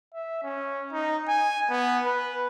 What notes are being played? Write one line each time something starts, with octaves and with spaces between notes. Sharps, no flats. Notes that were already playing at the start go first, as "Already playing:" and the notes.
E5
C#4
D#4
G#5
B3
B4